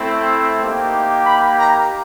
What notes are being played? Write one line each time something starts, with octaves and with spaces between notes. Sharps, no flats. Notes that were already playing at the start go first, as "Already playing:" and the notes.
Already playing: A3 C4 E4
A#3 D#4 G4
B5
A#5